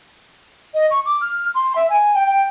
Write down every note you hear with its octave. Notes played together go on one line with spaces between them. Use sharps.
D#5
C#6
D6
F6
C6
E5
G#5
G5
G5